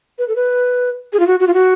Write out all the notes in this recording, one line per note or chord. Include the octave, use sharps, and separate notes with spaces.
B4
A4
B4
G#4
F4
F#4
F#4
F4
F#4